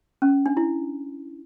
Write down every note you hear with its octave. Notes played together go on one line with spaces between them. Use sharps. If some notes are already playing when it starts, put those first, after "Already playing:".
C#4
D4
E4